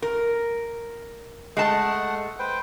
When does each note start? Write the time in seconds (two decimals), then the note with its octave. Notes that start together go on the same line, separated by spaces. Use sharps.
0.02 A#4
1.57 G#3 A3 F#5 A5
2.39 B4 C5 G5